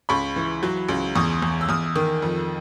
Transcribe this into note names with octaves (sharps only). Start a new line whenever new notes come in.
C#2 B5 C#6
E3
F#3
C#2
E2 C#6 D#6
E2
E6
E2 D#6 F6
D#3
F2